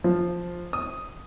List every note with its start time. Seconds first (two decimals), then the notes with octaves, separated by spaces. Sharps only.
0.04 F3
0.73 D#6